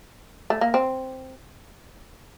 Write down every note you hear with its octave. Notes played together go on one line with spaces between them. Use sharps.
A3
A#3
C4